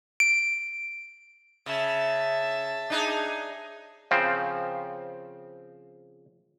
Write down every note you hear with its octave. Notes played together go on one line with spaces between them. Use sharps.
D7
C#3 E5 A5
D4 D#4 G#4
C#3 F3 C4